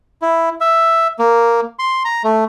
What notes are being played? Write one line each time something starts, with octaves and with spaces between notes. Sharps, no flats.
E4
E5
A#3
C6
A#5
A3